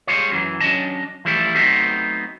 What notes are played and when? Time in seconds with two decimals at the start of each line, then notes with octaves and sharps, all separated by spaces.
0.07 G3 G#3 F4 C#5
0.31 F#2 E3 F#3
0.60 F#3 C#4 D4 D#5 A5
1.25 E3 F3 G3 A3 E4 A4
1.54 F#3 A3 B3 C4 D#4